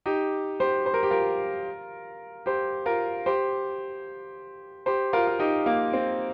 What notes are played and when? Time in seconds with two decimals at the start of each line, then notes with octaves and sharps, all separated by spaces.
0.06 D#4 G4
0.60 G4 C5
0.86 C5
0.94 A#4
1.03 G4
1.10 F4 A#4
2.46 G4 C5
2.86 F4 A#4
3.26 G4 C5
4.86 G4 C5
5.13 F4 A#4
5.27 F4
5.39 D#4 G4
5.66 A#3
5.93 C4